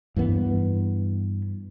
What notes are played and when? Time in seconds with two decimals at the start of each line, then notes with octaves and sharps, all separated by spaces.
0.16 G2 E3 B3